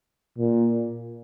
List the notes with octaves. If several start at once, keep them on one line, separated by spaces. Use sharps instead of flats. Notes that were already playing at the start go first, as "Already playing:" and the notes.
A#2